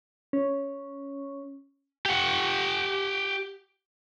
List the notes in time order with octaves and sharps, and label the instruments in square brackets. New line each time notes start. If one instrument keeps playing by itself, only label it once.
[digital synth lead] C#4
[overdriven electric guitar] G4 F#5